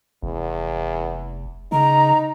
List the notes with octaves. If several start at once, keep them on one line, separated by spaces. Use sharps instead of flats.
F1 E2
C#3 D#4 A#5